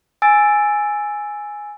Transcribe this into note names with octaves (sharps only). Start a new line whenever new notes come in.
G#5 E6 A6 D7